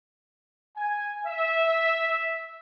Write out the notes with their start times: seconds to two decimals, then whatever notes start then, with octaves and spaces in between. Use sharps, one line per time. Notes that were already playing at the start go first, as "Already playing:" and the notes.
0.76 G#5
1.26 E5